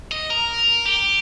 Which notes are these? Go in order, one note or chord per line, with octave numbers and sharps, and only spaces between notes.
D#5
A#4
G4